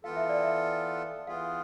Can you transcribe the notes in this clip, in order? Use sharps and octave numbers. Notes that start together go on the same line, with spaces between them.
E3 B3 F4 A4 F5
E5
D5
E5
E3 B3 F4 G#4 F5